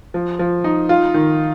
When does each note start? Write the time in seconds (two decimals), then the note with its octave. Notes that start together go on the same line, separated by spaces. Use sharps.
0.14 F3
0.39 F3
0.64 D#4
0.89 F4
1.14 D#3